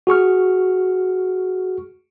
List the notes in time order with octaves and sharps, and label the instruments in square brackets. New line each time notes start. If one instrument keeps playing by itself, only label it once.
[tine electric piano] F#4 G#4 C#6 F6